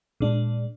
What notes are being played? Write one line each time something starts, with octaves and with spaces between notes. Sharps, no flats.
A#2 G#3 D4